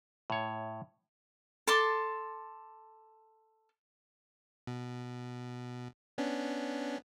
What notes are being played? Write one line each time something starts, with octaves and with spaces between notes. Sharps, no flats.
A2 C#5
A4 A5 C6 D6
B2
B3 C#4 D4